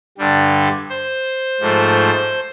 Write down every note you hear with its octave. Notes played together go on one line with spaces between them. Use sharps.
G2 D3 G3
C5
G#2 F3 A3